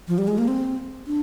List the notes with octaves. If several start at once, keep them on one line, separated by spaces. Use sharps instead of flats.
F3
G3
G#3
A#3
C4
D4